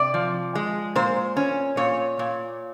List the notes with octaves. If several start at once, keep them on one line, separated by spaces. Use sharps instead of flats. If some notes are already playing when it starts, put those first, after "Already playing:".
Already playing: C3 D5
F3
G#3
A#2 C5
C#4
A#2 C#5
A#2